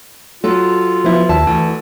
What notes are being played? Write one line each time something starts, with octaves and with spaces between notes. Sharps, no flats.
F#3 F4 A4
F3 B3 E4
D#2 E5 A5
D2 E3